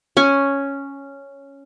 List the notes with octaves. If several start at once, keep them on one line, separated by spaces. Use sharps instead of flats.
C#4 G#5